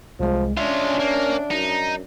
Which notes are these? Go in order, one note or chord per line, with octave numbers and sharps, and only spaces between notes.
C2 F3 G#3
G#3 C#4 D4 F4 E5
A#3
F#2 D#4